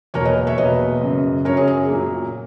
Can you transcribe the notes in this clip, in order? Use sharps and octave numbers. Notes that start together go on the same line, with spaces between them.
E2 B2 F#3 A#3 A#4 C#5
B4 D#5
C#5 E5
E2 B2 F#3 A#3 B4 D#5
F#2 C#3 F#3
F#2 C#3 F#3 A#4 C#5
G#4
G#4
A#2 F#3 A#3